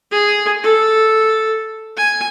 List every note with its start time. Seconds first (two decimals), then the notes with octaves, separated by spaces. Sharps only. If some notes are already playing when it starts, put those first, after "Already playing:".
0.11 G#4
0.63 A4
1.97 G#5